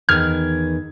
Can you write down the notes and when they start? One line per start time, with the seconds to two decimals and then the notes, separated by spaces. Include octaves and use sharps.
0.09 E2 D#3 F6 G#6